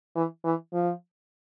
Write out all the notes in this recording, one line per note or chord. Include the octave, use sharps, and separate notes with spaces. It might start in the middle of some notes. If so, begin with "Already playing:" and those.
E3
E3
F3